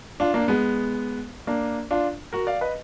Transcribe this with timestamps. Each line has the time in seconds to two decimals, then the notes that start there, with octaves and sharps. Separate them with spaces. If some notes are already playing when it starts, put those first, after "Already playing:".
0.20 D4 F4
0.34 A#3 D4
0.48 G#3 B3
1.47 A#3 D4
1.91 D4 F4
2.33 F#4 A#4
2.47 D5 F5
2.61 B4 D#5